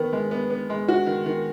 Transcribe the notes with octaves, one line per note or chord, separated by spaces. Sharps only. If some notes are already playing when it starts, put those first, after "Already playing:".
Already playing: D#3 B3
G#3
B3
B3
G#3
F#4
D#3
D#3